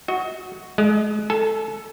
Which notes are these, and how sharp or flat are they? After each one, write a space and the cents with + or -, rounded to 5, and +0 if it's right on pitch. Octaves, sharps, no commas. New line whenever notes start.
F#4 +0 D#5 +40
G#3 +35 D#5 -25
A4 +5 G#5 +45